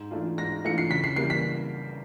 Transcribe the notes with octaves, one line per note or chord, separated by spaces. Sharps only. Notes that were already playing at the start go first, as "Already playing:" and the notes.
Already playing: G#2
E3 A3 D4 F4
G#2 A#6
E3 A3 D4 F4 C#7
C7
C#3 B6
C7
E3 G3 A#3 C7
B6